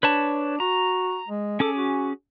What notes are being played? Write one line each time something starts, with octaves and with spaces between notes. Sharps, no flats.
D4 B4 C#5 A5
F#4 A#5
G#3
C#4 G#4 A4 D6
F#4